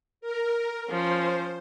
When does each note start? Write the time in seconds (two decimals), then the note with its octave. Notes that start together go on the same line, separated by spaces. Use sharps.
0.21 A#4
0.90 F3 C#4 C5